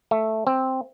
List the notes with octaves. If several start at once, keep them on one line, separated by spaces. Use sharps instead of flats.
A3
C4